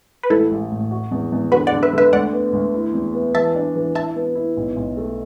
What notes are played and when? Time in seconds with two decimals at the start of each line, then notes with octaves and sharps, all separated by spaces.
0.23 B4
0.30 A1 E4 A4
0.51 A1
0.72 A2
0.91 F#4
1.11 E2
1.32 E2
1.52 D3 F#4 B4
1.67 D5 F#5
1.72 D3
1.83 B4 E5
1.93 D3 B4 E5
2.13 D2 D5 F#5
2.33 B3
2.53 D2
2.74 E4
2.94 E2
3.14 B3
3.35 E3 E5 A5
3.55 D4
3.76 E3
3.95 E4 E5 A5
4.16 B3
4.35 E4
4.57 B1
4.77 B1
4.97 A3